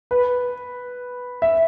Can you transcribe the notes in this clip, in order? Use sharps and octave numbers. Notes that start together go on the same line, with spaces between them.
B4
E5